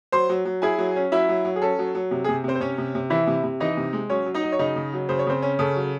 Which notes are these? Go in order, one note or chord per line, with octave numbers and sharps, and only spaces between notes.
F#3 C5 C6
F#3
F#3
E4 G#4 G#5
F#3
C#4
F#3 E4 E5
F#3
F#3
G#4
C#4 A4
F#3
F#3
C3
G#4
C3
C3 C4 C5
C5
C3 C#4 C#5
C3
C3
E3 E4 E5
C3
C3
E3 D#4 D#5
C3
G#3
F#3 C#4 C#5
F#3
D#4 D#5
F#3
C#5
C#3 D#4 D#5
C#3
F#3
C#3 C5
C#5
C#3 C4 C5
C#4
C#3 A4
F#3